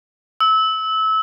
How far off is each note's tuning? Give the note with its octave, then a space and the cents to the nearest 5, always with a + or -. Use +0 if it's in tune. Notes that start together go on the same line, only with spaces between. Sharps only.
E6 -25